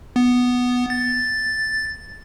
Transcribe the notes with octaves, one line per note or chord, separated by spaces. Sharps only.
B3
A6